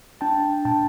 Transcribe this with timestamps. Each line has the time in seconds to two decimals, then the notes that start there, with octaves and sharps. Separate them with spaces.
0.21 D4 G5 A5
0.65 A#2 G5 A5